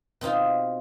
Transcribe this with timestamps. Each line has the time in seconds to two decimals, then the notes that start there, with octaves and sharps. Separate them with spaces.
0.21 B2 C4 D#4 F4